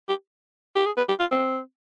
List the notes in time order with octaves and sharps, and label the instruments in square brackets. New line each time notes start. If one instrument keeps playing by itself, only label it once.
[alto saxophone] G4
G4
G#4
B4
G4
F4
C4